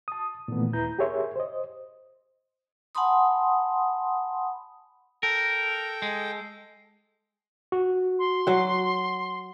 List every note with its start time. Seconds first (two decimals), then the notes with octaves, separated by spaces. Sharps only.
0.08 A5 D#6
0.48 A#2 D#3 E3 A3 B3
0.73 D#2 E4 B4 A#5 G6
0.99 G4 G#4 A#4 C#5 E5 C6
1.36 C5 D#5
2.95 F#5 G#5 A5 B5 C6 D#6
5.23 A4 A#4 G5
6.02 G#3
7.72 F#4
8.19 C6
8.47 F#3 F#5